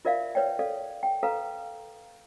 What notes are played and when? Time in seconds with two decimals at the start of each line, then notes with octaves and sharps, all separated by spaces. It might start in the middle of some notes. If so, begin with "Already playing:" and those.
0.05 F4 A#4 D5 E5 F5
0.35 B4 C#5 D5 G5
0.59 A4 D5 F5
1.03 G5
1.23 A4 B4 F5 A#5